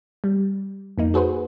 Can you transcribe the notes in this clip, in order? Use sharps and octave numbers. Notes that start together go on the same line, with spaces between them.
G3
F2 A#3 D#4
F#4 G#4 B4 C5